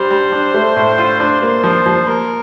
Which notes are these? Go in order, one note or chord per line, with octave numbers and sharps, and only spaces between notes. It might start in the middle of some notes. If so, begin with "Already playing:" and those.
Already playing: G3 D4 C5
G3
D4
A3
A2
F4
D4 C5
A#3 C5
F3 C5
F3
A#3 A#4